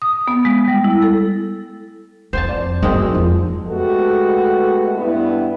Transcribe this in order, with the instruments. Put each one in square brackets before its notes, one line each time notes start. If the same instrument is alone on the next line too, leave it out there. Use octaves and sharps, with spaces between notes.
[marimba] D#6
B3
G#3
G3
E4
A4
[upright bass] F2 [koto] C5 G#5 A5
[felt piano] D5
[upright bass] F#2 [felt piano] F#3 D#5 [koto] G#3 A#3 C4
[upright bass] F2 [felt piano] F3
[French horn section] G#3 A3 B3 F#4 G4 A4
G2 B3 E4